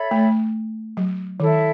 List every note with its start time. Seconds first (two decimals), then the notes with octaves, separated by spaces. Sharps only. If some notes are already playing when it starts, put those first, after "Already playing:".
Already playing: A4 C#5 E5 B5
0.11 A3
0.97 F#3
1.40 D#3 E4 A4 E5